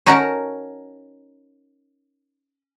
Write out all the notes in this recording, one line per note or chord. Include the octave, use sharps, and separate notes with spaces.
C#4 D#4 F#4 A#4 A5 A#5